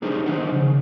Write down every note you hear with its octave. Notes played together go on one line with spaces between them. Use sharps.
B3 D4 D#4 G4 G#4 C5
D#3 F3 D4 D#4 C5 F#5
C#3